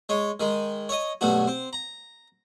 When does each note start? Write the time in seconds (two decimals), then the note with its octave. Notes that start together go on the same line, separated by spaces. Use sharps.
0.09 G#3 C#5
0.40 D#3 G#3
0.89 C#5 D#5
1.21 B1 G2 A3 F#4
1.47 C4
1.73 A#5